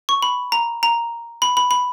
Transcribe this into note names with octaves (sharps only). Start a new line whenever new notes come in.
C#6
B5
A#5
A#5
B5
B5
B5